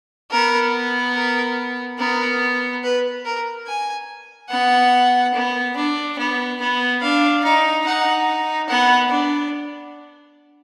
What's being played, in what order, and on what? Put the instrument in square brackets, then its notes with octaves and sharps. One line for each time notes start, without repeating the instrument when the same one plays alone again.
[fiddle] B3 [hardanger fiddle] A#4
[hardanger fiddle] A#4
[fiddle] B3 [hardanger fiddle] A#4
[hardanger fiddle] B4
A#4
G#5
[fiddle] B3 [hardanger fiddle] F#5
[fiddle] B3
D4
B3
B3
[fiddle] D4 [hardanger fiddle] F5
[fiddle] D#4
[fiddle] D#4 [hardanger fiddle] F#5
[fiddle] B3 [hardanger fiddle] F#5
[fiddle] D4